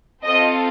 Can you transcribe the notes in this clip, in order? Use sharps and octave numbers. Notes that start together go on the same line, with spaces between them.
C4 F4 A4 D#5